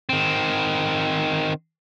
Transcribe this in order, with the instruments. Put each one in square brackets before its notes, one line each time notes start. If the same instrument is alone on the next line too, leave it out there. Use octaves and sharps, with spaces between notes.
[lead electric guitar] D#3 C4